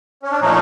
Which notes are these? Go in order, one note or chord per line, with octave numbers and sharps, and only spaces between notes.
C#4
D4
A#2 F3 A3 C#4 D#4